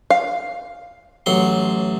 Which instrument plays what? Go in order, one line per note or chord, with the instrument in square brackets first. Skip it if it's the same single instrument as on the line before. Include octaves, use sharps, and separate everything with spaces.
[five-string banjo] F5
[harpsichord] A1 F#3 C6